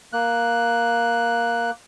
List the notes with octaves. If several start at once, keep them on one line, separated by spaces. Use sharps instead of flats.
A#3 F#6